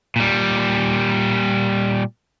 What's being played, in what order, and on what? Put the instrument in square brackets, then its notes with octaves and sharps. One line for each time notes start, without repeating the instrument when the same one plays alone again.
[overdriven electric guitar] A#2 G3